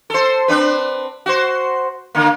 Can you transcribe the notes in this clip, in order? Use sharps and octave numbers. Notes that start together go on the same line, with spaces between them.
A4 C5
C4 D4 B4
F#4 C5
D3 A#3